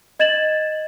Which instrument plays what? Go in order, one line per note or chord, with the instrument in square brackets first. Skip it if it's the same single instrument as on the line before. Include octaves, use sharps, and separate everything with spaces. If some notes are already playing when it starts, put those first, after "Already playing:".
[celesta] D#5 G#6 A6 E7 F#7